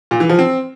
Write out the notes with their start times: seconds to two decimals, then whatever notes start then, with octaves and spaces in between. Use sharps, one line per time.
0.11 A#2
0.20 E3
0.29 F3
0.39 C4